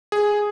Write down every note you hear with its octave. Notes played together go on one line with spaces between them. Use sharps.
G#4